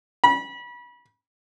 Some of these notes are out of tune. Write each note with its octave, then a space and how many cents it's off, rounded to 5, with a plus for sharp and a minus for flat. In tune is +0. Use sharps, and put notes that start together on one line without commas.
B5 -30